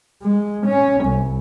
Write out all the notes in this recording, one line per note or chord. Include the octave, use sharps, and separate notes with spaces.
G#3
C#4
C2